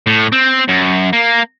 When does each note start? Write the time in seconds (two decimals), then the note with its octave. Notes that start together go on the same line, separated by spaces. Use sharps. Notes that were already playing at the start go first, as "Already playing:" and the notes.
0.07 A2
0.32 C4
0.68 F#2
1.13 A#3